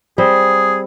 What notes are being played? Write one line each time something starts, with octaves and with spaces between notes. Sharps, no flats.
G3 C4 G#4